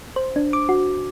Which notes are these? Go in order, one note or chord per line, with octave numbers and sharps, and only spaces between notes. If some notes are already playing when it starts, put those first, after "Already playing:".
C5
D4
D6
F#4